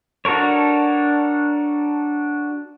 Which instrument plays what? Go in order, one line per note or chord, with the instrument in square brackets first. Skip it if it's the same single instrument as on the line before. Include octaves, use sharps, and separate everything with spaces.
[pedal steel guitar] D4 F#4 A4 A#4 C#5